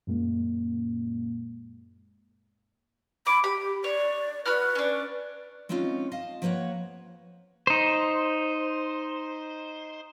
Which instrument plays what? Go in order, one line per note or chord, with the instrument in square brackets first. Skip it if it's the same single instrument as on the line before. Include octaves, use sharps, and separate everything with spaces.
[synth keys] F#2 A#2 G#3 A#3
[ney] B5 [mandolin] D6
[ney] G4 [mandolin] B5
[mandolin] C#5 [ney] D5
[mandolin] F#4 B5 F6 [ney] B4
[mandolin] C#4 D4
[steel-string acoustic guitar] G#3 C4 C#4 D#4 F4
D#5 F5 A5
F3 A#3 B4 C#5 F#5
[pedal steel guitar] D#4 C5